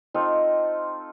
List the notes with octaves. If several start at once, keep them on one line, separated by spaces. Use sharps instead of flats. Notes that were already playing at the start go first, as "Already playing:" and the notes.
C4 D#4 F4 A4